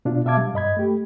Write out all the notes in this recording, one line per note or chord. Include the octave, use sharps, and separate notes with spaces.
B2 D4 F4
B2 E5 F5 A5 D6 G#6
G3
G2 D#5 B5 G#6
A3 G4